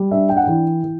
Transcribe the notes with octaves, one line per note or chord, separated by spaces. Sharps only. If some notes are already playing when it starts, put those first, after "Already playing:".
Already playing: G3
D4 E5
G5
F#5
E3 G5
E3